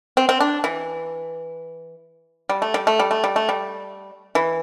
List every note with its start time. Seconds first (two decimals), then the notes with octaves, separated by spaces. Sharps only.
0.17 C4
0.29 C4
0.41 D4
0.64 E3
2.49 G3
2.62 A3
2.74 G3
2.87 A3
2.99 G3
3.11 A3
3.24 G3
3.36 A3
3.49 G3
4.35 E3